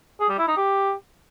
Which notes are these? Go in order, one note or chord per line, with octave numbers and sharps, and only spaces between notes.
G#4
G3
E4
D#4
G4